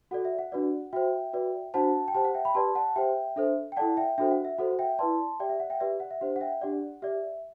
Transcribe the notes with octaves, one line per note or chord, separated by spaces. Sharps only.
F#4 A4 D5 F#5
E5
F#5
D4 F#4 B4 D5
F#4 C5 E5 G5
F#4 B4 D5
D4 F#4 C5 F#5 A5
G5
G4 C5 F#5 A5
F#5
E5 G5
G5 B5
G4 B4 D5 A5 C6
F#5 A5
G4 C5 E5 G5
D4 A4 C5 E5
G5
E4 A4 D5 F#5 A5
E5 G5
D4 F#4 A4 C5 E5 G5
F#5
E5
F#4 A4 C5 F#5
F#5
E5 G5
E4 B4 D5 A5 C6
G4 D5 E5 G5
E5
F#5
E5 G5
G4 B4 D5 E5
F#5
E5
D4 G4 C5 F#5
F#5
E5 G5
D4 G4 D5 F#5
G4 D5 E5